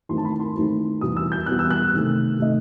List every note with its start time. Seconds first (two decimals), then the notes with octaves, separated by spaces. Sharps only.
0.09 D#2 D#3 A3 C4 E4 C6
0.17 A5
0.25 B5
0.40 C6
0.55 D#2 D#3 A3 C4 E4
1.01 E2 B2 G3 B3 D#6
1.17 E6
1.32 G6
1.46 E2 B2 G3 B3 F#6
1.59 E6
1.70 F#6
1.92 C3 D#3 A3
2.39 C3 D#3 A3 D#5